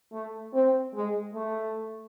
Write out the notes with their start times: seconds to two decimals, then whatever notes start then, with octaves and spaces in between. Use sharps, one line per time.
0.12 A3
0.53 C4
0.94 G#3
1.34 A3